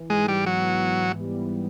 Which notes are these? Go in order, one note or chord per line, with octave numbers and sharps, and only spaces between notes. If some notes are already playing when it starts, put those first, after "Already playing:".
Already playing: E3
G#2 G#3
G3
F#3 B3
E3
G3